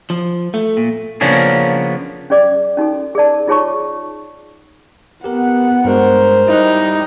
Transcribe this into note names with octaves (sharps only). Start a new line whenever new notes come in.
F3
A3
A#2
C#3 F3 A#3 B3 C#4 D4
C#4 G#4 D5 D6
C#4 D#4 F#4 A4
G#4 A#4 D5 A5
D#4 F4 G#4 C#5 A5 C#6
B3 G4 A#4 F#5
G2 G#3 F#4 A#4 C5
G3 D#4 E4 F#6